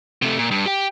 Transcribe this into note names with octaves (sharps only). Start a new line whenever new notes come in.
C3 A3
A#2
G2
G4 G5